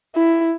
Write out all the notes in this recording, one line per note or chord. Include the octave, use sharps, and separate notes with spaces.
E4